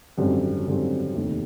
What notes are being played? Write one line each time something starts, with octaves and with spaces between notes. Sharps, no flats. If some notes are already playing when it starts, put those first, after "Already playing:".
G#1 F#2 D3 G3 C4
G#1 F#2 D3 G3 C4
F1 D#2 D#3